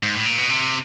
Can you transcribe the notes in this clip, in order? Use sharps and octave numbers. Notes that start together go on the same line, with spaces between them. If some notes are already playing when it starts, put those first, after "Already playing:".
G#2
A2
A#2
B2
C3